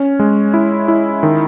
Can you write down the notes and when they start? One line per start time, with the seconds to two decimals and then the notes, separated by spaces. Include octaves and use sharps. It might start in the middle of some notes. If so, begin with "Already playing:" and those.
Already playing: C#4
0.20 G#3
0.54 E4
0.88 E4
1.23 D#3